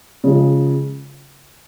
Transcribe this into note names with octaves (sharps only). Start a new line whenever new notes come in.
C#3 F3 G#3